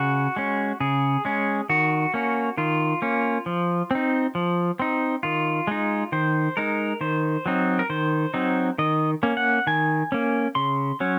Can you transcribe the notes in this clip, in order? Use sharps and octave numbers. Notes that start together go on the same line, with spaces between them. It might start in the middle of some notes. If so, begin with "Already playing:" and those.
Already playing: C#3 F#4
G#3 C#4
C#3 G#4
G#3 C#4
D#3 F#4
A#3 C#4
D#3 F4
A#3 C#4
F3
C4 D#4
F3
C4 D#4
D#3 F4
G#3 D#4
D#3 C5
G#3 D#4 A#4
D#3 C5
F#3 C4 D#4
A#4
D#3 C5
F#3 C4 D#4
D#3 D#5
A#3 C#4
F#5
D#3 G#5
A#3 C#4
C#3 C6
F#3 C#4